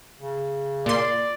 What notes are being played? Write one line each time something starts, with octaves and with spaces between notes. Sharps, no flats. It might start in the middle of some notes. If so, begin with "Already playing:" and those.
C#3
A#2 D5 C6